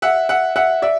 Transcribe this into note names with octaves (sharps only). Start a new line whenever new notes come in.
E5 F#5
E5 F#5
E5 F#5
D5 E5